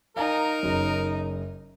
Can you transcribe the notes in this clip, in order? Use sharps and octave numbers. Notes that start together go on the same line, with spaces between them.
D#4 A#4 F5 G#5 A#5
F#1 F#2